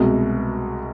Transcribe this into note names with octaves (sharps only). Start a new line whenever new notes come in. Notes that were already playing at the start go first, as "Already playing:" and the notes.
Already playing: C2 B2 G#3